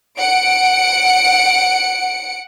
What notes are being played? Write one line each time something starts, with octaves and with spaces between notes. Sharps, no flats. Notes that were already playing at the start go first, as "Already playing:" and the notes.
F#5 C#7 D7